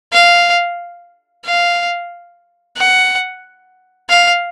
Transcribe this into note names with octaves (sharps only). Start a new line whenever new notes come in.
F5
F5
F#5
F5